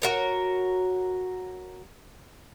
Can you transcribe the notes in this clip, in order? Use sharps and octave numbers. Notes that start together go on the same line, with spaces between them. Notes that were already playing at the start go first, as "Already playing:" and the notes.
F#4 A#4 C#5